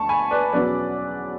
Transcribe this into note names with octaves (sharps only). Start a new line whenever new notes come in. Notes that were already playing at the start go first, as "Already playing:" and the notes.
Already playing: D2 A3 A5 C#6
G#5 B5
B4 D5
E2 B2 F#3 C#4 B4 D5